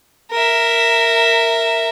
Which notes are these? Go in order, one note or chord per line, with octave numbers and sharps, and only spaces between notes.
A#4 E5